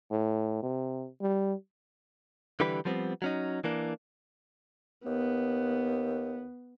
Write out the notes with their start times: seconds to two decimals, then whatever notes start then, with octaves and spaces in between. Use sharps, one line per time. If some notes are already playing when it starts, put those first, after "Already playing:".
0.11 A2
0.63 C3
1.21 G3
2.60 D3 E3 G3 G4 B4
2.85 F3 G3 B3 C4
3.22 F#3 C#4 D#4
3.64 E3 A#3 D4
5.06 D#2 B3